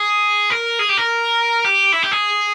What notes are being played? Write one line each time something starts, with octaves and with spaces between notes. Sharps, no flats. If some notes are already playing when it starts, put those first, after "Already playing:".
Already playing: G#4
A#4
G#4
G4
A#4
G4
E4
G4
G#4